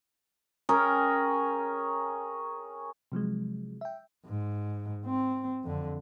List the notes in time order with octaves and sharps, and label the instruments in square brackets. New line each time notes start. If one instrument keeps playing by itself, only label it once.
[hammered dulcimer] C#4 G#4 A#4 G5
[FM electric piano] C3 F3 F#3 G#3
E5 G5
[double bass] G#2
C4
F2 D3